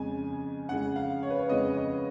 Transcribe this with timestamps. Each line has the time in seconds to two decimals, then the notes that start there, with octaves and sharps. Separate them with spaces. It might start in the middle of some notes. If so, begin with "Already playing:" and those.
Already playing: F2 C#3 G#3 G#5
0.69 F2 C#3 G#3 F#5
0.96 F5
1.23 C#5
1.30 B4
1.39 C#5
1.49 F2 C#3 G#3 D#5
1.77 D#5